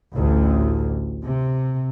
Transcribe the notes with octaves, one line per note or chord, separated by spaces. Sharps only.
A1 D2
C3